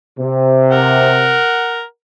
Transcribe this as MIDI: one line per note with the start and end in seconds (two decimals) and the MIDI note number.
0.19 1.39 48
0.71 1.83 70
0.71 1.83 78